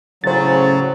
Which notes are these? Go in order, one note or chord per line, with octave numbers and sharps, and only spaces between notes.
A2 C#3 F#3 C5 A6